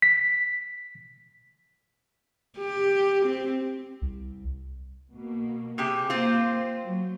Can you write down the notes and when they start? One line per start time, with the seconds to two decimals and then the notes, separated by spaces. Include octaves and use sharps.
0.02 B6
2.58 G4
3.26 C4
4.02 C2
5.13 B2 A#3
5.78 C3 G4 G#4
6.10 A#3 C4 F4 C5
6.85 F#3